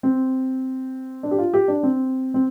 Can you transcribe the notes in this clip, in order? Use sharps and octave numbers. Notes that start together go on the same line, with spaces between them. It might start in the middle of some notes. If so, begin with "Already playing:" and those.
C4
D4
G4
F4
G4
D4
C4
C4